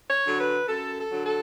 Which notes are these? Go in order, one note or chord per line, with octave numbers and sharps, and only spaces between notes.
C#5
D3 F#3
B4
F#2 A4
A4
D3 F#3
A4